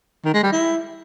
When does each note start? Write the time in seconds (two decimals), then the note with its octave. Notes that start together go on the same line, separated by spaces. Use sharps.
0.25 D#3
0.34 G#3
0.43 G3
0.52 E4